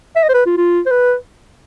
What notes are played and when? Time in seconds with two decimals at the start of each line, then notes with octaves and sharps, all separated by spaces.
0.16 E5
0.23 D#5
0.29 C5
0.34 B4
0.46 F4
0.57 F4
0.86 C5
0.91 B4